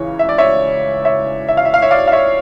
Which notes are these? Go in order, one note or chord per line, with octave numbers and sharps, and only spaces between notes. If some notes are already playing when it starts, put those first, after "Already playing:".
Already playing: C#2 C#3 E3 C#5
E5
D5
C#5 E5
C#5 E5
E5
F5
E5
F5
C#5 E5
D5 F5
F5
C#5 E5